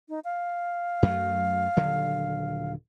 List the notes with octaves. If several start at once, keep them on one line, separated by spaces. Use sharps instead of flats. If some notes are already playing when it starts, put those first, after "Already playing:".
D#4
F5
F#2 F#3 A3
D#1 D3 F#3